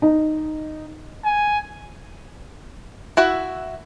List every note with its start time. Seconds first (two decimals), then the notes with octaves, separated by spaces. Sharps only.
0.02 D#4
1.24 G#5
3.17 E4 F#4 E5